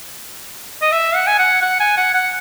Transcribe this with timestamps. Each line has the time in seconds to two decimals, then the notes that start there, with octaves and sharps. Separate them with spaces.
0.82 D#5
0.92 E5
1.15 F#5
1.27 G#5
1.39 F#5
1.62 F#5
1.80 G#5
1.97 F#5
2.14 F#5